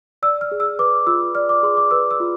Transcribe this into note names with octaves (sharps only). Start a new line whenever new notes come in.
D5 E6
F6
G#4
E6
B4 D6
F4 E6
D5 F6
D6
G#4 C6
D6
B4 E6
E6
F4